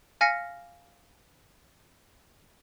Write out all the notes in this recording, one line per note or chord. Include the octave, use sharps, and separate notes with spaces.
F5 G#5 F6 A#6 B6 C#7